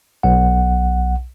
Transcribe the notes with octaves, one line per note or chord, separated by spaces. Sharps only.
B1 F#5